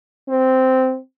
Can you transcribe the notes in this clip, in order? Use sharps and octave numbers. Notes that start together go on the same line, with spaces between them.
C4